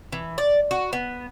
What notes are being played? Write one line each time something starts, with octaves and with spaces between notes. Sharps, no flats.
E3
D5
F#4
B3